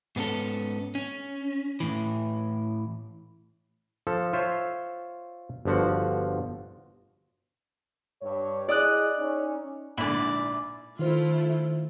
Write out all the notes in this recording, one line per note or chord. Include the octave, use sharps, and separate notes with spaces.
G#2 B3 C#4 A4
C#4
A2 E3
F3 A4
F4 C5 C#5 E5
G1 D3 F3 F#4 F#5
G2 C#5
E4 G#4 D5 D#5 D#6 F#6
C#4 D#4
A#1 G#2 D3 E4 D5
D#3 A3 E4 F4 C5